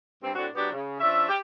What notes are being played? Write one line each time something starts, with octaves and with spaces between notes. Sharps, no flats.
G2 C4
A2 C4 D4 F#4
F#3 B3 D4 F#4 G4
C#3
F3 C#4 D4 E5
G4